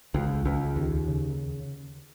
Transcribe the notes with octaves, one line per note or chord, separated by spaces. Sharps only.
C#2
C#2
D#2
C#3